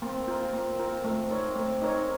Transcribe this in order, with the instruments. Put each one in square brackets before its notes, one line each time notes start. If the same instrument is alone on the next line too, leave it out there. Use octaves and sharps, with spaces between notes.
[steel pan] A#3 [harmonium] C4
[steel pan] F4 A#4
A#3
F4 A#4
A3
D#4 A#4 C#5
A3
D#4 A#4 C#5